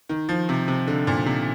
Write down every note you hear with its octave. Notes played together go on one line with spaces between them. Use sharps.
D#3
F3
C3
C3
D3
A#2
C3